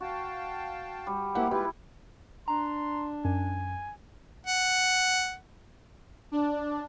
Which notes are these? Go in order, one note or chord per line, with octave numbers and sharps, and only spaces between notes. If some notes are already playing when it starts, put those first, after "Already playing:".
F#4 F5 G5 A5
G3
A#3 C4 E4 G4 F#5
G#3 E4 F4 G4 B4
D4 A#5 C6
F#2 G#5
F#5
D4